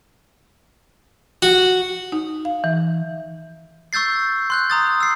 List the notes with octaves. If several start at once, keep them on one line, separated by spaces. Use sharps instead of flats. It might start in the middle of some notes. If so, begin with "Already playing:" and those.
F#4
D#4
F5
E3
C#6 E6 G6 A6 C7
C6 F#6 G6
A#5 D#6 A6
E6 C7